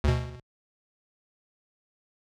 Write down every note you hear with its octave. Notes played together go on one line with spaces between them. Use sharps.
D2 B2